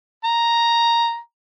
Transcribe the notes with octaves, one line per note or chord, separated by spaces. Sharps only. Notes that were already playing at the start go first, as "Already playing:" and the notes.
A#5